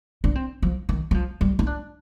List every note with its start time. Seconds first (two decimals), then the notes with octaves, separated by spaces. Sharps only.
0.24 D4
0.35 C4
0.62 F3
0.89 D#3
1.11 G3
1.14 F3
1.41 G3
1.59 D#4
1.67 D4